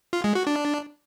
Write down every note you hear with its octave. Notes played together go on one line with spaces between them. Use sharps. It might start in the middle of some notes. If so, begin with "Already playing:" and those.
F4
G#3
F#4
D4